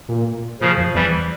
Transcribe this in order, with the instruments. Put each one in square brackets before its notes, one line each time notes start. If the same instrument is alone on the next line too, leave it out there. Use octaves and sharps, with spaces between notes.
[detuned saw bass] A#2
[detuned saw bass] A#2 [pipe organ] C#3 F3
[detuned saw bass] F2
[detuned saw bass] E2 [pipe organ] E3 G3